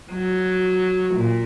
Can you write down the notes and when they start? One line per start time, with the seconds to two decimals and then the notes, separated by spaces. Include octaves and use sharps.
0.12 F#3
1.14 A#2